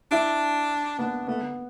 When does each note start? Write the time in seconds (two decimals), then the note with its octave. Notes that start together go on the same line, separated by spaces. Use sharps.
0.11 D4 E4
0.99 B3 D4
1.27 A3 B3
1.42 D3